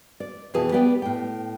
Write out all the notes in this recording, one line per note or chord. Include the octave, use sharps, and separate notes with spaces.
D5
F2 B2 E3 E4 G#4 A5
B3 G4 B4 D5 G5
A2 G5